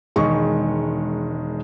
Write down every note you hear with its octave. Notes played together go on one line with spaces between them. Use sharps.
E1 D#3 G#3 C#6